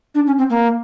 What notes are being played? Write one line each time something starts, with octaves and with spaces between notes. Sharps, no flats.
D4
C#4
C4
A#3